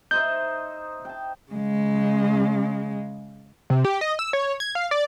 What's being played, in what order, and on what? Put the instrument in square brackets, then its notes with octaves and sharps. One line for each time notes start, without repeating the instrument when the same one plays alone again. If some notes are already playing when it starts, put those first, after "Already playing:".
[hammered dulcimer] D#4 C5 E5 [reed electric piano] G6
[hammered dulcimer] G5 A5
[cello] C#3 G#3
[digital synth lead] C3
G4
D#5
E6
C#5
G#6
F5
D5